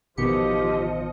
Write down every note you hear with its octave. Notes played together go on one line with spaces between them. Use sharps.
A1 B2 D#3 F3 G4 D#5 C#7